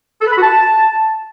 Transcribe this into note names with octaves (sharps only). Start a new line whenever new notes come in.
A4
B4
B5
F#4
A5